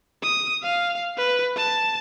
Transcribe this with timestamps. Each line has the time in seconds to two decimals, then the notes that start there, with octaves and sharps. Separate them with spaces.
0.23 D#6
0.63 F5
1.17 B4
1.57 A5